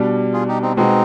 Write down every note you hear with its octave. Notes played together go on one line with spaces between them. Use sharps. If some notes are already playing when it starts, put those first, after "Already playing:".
Already playing: B2 G3 D4
F4 G#4
D#4 G4
C4 D#4
B2 G#3 B3 C4 D#4